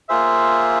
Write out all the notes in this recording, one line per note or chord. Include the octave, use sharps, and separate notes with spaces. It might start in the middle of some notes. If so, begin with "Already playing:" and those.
A#3 F4 G#4 C5 E5